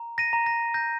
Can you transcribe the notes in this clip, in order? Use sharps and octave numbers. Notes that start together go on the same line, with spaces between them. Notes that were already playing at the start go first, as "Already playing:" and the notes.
Already playing: A#5
A#6 D#7
A#5
A#6
G6 A#6